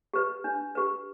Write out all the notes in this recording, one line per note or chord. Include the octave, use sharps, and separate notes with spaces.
G4 B4
D4
G4 B4